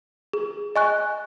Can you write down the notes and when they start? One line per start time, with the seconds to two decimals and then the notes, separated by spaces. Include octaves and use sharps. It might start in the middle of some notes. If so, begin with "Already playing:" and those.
0.33 G#4
0.76 D#5 G#5 C#6 F#6